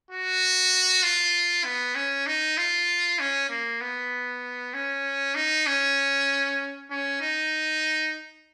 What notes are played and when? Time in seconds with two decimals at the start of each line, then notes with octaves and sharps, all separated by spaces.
0.11 F#4
1.03 F4
1.65 B3
1.95 C#4
2.26 D#4
2.57 F4
3.19 C#4
3.49 A#3
3.81 B3
4.74 C#4
5.35 D#4
5.67 C#4
6.90 C#4
7.21 D#4